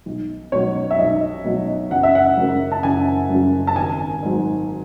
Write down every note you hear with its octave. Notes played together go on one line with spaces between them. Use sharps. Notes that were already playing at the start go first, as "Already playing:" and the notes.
B1
B2 F#3 C#5
E5
B1 D#5
B2 F#3
F#1 F#5
E5
F#5
F#2 C#3 F#3
A5
F#1 G#5
F#2 C#3 F#3
A5
G#1 G#5
G#2 F#3